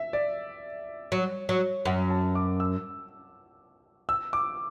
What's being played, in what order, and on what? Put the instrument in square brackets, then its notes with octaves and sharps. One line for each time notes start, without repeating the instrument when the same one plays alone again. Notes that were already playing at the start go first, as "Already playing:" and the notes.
Already playing: [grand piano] E5
D5
[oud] F#3
F#3
[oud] F#2 [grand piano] F#5
[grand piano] A5
D6
E6
E6
D6